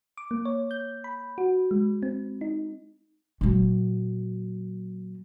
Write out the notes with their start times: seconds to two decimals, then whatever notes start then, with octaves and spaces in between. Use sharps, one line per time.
0.17 D6
0.31 A#3
0.45 C#5
0.71 G6
1.04 B5
1.38 F#4
1.71 G#3
2.03 C4
2.41 D#4
3.41 A#2 F#3